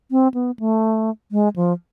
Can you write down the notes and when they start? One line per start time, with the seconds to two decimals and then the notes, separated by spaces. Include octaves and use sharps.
0.11 C4
0.34 B3
0.59 A3
1.32 G#3
1.56 F3